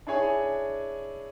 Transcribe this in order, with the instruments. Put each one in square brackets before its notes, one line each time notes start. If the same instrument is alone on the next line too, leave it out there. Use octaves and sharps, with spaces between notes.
[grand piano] D4 E4 G#4 C#5 G#5